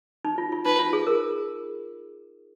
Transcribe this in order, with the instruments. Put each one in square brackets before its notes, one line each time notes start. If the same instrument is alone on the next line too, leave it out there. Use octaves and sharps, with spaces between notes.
[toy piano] D#4
F4
F4
[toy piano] D#4 [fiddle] B4
[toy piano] F4
G#4
A#4